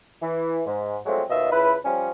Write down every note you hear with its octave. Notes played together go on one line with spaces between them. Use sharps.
E3
G#2
F3 F#3 G#3 A3 C4
D#2 B2 F4 D#5 E5
C#2 E4 B4
F3 G3 C#4